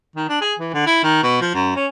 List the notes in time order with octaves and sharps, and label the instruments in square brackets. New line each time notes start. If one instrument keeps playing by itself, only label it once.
[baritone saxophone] D#3
D4
G#4
E3
D3
E4
D#3
B2
F3
F#2
C#4